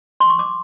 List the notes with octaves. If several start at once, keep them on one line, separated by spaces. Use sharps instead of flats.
C6
C#6
D6